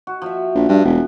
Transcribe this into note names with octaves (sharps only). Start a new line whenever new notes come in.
F#4
F3 F#4 E5
A#1
G2
E1